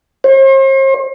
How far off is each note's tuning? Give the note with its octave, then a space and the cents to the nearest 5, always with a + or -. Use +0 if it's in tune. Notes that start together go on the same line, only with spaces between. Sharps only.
C5 +45